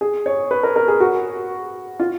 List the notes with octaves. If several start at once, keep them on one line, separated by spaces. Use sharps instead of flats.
G#4
C#5
B4
A#4
A#4
G#4
F#4
F4